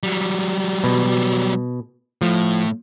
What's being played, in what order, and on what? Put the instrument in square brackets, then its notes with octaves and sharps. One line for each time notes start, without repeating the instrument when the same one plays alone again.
[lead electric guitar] F#3 G3
[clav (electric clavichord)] B2
[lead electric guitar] A2 A3 [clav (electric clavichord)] F3